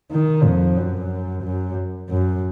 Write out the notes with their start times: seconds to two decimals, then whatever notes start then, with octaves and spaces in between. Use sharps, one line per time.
0.12 D#3
0.44 F2
0.77 F#2
1.44 F#2
2.10 F#2